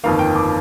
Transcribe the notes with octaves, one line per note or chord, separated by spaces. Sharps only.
G1 F2 D#3 A#3 F5
G5
D6